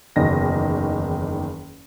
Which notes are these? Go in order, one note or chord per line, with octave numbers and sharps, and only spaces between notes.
F#1 E2 D#3 G#4 D#5 A#6